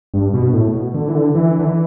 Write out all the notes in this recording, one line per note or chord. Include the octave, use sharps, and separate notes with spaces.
G2
B2
A2
B2
D3
E3
D3
E3
D3
E3